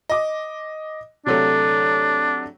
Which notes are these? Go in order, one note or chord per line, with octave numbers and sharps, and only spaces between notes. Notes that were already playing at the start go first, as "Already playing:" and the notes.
D#5 D6
C3 F#3 A3 D4